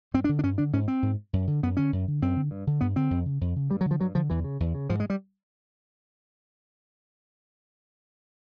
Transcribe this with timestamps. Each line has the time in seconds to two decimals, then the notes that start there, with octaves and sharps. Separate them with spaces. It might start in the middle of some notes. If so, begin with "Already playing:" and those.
0.14 G2 C4
0.24 D4
0.29 D3
0.39 D4
0.43 G2 C#4
0.58 D3 D4
0.73 G#2 C#4
0.88 C4
1.02 G#2
1.33 F#2
1.47 D3
1.63 F#2 B3
1.77 D3 C#4
1.92 F#2
2.08 D3
2.22 F#2 C4
2.36 D3
2.51 G2
2.67 D3
2.81 G2 B3
2.96 D3 C4
3.11 F2
3.25 C#3
3.41 F2
3.56 C#3
3.70 G2 G3
3.81 F#3
3.86 D3
3.91 F3
4.00 G2 F#3
4.15 D3 F3
4.30 E2 E3
4.44 C#3
4.60 E2
4.74 C#3
4.89 G#2 F3
5.00 G#3
5.10 G3